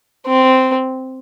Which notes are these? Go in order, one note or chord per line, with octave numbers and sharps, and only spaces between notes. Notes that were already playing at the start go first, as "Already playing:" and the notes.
C4